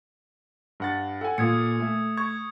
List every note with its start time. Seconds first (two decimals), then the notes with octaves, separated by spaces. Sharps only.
0.80 G2 F#5 A6
1.21 A4 F#5 G#5
1.38 A#2 A#3 D#6 G#6 C#7
1.80 A3
2.17 C#6 G#6